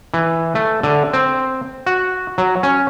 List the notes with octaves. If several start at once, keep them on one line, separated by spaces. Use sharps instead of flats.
E3
A3
D3
C4
F#4
F#3
C#4